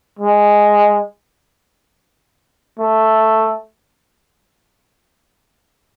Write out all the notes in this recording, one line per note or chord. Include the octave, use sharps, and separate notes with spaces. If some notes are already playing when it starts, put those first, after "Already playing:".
G#3
A3